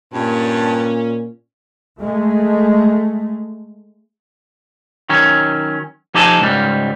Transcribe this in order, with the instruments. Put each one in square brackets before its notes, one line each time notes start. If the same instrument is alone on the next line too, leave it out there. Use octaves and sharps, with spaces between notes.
[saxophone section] G2 [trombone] A#2 [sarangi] C#4
[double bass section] G#3 A3
[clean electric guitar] D#3 F#3 C#4
F3 D#4 G4 A4 G#5 A5
C#2 G#2 G3